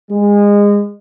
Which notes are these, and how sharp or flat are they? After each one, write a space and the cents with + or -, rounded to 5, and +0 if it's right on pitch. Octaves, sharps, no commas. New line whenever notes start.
G#3 -25